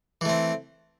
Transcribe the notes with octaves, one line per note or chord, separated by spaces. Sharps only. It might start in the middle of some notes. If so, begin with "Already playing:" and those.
E3 A3 C4